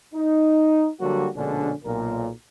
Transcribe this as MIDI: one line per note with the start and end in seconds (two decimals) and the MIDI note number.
0.15 0.89 63
1.00 1.27 50
1.00 1.27 54
1.00 1.27 55
1.00 1.27 58
1.00 1.27 66
1.35 1.72 34
1.35 1.72 47
1.35 1.72 50
1.35 1.72 56
1.35 1.72 61
1.35 1.72 62
1.85 2.29 35
1.85 2.29 46
1.85 2.29 70